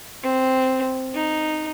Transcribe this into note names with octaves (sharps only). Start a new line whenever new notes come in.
C4
D#4